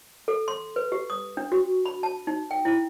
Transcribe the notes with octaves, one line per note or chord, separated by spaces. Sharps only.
A4
C6
B4
G4
D#6
D4
F#4
B5
A5
D#4
G5
E4